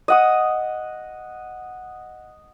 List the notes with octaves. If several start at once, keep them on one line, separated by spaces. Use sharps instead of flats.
D#5 F#5 D#6